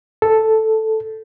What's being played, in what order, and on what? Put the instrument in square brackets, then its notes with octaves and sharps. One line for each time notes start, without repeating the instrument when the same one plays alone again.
[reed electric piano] A4